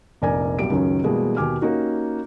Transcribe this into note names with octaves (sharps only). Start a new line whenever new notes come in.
F1 A#1 A#4 D5 G#5
B1 G3 G4 D7
C#2 F#2 D#3 F#3 C#4
B2 E3 G3 G#3 A#3
D#2 B2 G4 G#5 D6 F6
A#3 C#4 D#4 F#4 G4